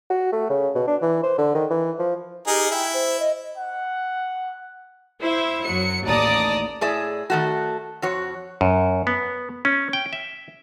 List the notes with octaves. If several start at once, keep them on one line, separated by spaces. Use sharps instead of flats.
F#4
A3
C#3
B2
D4
E3
C5
D3
D#3
E3
F3
D#4 G4 G#4 A#4
E4 G5
C5
D#5
F#5
E4 C5 E5
F#2 F#3 C#7
A1 D#2 D5 A5 A#5 D#6
A2 G#4 D5 E5
D#3 A3 F#4
F2 F#4 C#5
F#2
B3
C#4
G5
E5